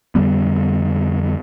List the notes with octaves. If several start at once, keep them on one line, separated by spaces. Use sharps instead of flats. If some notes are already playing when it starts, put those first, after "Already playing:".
F2 D3 G3 B3